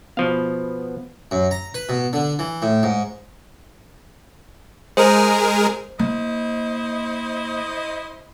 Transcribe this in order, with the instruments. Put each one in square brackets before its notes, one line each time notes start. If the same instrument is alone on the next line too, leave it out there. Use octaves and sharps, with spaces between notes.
[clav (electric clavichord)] B2 F3 F5 [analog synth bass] B3
[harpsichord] F#2
A#5
B4
B2
D3
E3
A2
G#2
[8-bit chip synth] G#3 G#4 A#4 [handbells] C5
[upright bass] A#3 [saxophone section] E4 C5 D#5